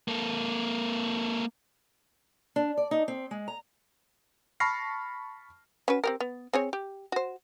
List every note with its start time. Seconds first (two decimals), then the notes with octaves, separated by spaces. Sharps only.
0.08 A#3 A4
2.56 D4
2.77 D5
2.91 D#4
3.08 C4
3.31 G#3
3.48 A#5
4.60 A5 B5 C#6 F6 A#6 C7
5.88 C#4 F#4 B4
6.04 C4 G4 A#4
6.20 B3
6.53 C4 G#4 C#5
6.73 G4
7.12 F#4 C5